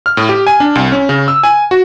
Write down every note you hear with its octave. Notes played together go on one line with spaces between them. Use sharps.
F6
A2
G4
G#5
D4
C2
C#4
C#3
E6
G#5
F#4